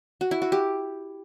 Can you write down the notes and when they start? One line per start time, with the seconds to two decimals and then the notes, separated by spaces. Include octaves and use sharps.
0.21 F#4
0.31 E4
0.42 F#4
0.52 G4